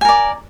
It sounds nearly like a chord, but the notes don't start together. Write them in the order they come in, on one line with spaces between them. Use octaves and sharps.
G#5 A#4 D5